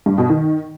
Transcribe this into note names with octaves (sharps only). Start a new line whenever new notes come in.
G2
B2
D#3